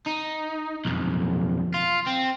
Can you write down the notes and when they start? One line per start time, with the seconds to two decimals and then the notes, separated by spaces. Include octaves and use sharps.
0.07 D#4
0.85 B1 F2
1.74 F4
2.07 C4